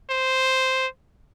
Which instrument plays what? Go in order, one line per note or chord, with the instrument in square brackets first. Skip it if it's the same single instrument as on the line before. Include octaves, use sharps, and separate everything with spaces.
[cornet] C5